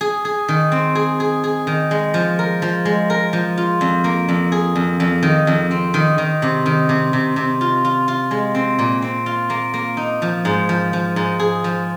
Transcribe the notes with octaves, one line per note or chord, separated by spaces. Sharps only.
G#4
G#4
D#3
C4
G#4
G#4
G#4
D#3
G#3
F3
A#4
F3
G#3
A#4
F3
F4
F2
A#3
F2
G#4
F2
F2
D#3
F2
C4
D#3
D#3
C3
D#3
C3
C3
C3
F4
F4
F4
G#3
C4
A#2
C4
F4
A#3
A#3
D#4
F3
G#2
F3
F3
G#2
G#4
F3